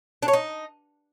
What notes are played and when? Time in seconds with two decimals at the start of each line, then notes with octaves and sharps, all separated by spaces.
0.23 D4
0.28 C#5
0.33 D#4